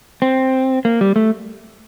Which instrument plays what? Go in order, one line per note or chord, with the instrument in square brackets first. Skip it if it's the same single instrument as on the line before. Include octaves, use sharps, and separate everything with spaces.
[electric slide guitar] C4
A#3
G3
A3